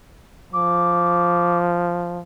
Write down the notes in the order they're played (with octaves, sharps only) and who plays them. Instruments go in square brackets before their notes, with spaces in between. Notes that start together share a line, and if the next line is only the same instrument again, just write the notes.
[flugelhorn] F3 [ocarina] D6